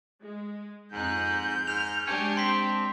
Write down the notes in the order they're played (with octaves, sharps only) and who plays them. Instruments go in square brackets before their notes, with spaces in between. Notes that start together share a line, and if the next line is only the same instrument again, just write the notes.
[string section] G#3
[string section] F2 D#4 F#6 [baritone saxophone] G#2 [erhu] G6
[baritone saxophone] G#2 [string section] F6 [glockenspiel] F7
[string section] G#3 D4 G4 [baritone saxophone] C#4
[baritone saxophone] C4 [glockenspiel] C6 B6